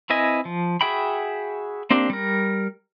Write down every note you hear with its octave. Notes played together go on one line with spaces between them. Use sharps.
C4 E4 B4 D#5 G#5
F3
F#4 G#4 E5 G5 B5
A#3 C4 D4 G4
G3 A#4